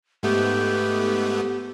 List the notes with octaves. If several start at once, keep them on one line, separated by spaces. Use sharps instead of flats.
G#2 A3 B3 G4